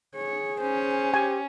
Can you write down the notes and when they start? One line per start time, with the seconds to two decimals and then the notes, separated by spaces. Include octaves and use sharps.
0.15 G#4 C#5
0.61 C#4 C5
1.14 G4 G#5